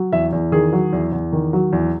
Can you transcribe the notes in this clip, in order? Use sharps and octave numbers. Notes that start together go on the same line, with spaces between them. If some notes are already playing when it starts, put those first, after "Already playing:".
Already playing: F#3
E2 E5
E2
D#3 G#4
F#3
E2
E2
D#3
F#3
E2